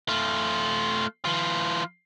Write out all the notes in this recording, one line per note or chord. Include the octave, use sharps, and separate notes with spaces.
A3 F4
E3 F4